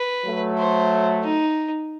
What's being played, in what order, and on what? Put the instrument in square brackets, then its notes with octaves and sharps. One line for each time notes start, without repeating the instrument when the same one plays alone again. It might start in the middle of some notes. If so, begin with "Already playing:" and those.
Already playing: [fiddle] B4
[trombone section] F#3 A3
[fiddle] C5
D#4